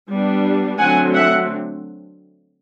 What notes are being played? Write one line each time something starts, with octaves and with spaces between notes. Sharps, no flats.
G3 B3 D4
D3 F#3 A3 C4 F#5 G#5
E5 F#5